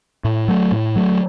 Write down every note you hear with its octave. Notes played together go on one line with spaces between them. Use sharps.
A2
F#3 A3
A2
F#3 A3